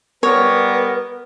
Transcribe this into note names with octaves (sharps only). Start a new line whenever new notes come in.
G3 B3 A#4 B4 C#5